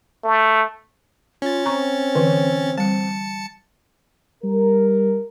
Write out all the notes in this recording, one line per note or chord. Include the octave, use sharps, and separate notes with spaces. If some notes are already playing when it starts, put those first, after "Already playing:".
A3
C#4 F4 A6
C4 A#5 C#6
D3 E3
G3 A5 C#7
G3 A#4